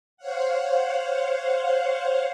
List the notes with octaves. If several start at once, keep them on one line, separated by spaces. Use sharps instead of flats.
C5 C#5 F5 F#5